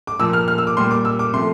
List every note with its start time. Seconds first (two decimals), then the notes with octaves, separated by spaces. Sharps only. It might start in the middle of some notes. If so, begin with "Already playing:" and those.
0.07 D6
0.20 A#2 F3 A#3 E6
0.33 F6
0.48 F6
0.58 E6
0.67 D6
0.77 A#2 G3 A#3 C6
0.91 D6
1.05 E6
1.19 D6
1.34 C3 F3 A3 C6